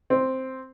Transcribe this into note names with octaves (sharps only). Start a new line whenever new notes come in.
C4